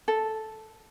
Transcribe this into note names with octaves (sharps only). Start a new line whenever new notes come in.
A4